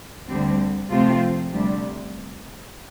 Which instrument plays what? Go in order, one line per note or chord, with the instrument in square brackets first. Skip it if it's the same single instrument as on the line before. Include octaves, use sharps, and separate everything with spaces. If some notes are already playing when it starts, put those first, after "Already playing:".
[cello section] D2 D3 G3 C4
C3 F3 A3 C4 F4
D2 C3 G3 D4